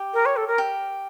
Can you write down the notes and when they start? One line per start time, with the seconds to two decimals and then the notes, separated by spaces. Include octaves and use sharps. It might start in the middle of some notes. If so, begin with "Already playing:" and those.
Already playing: G4
0.14 A#4
0.26 C#5
0.36 A4
0.47 A#4
0.58 G4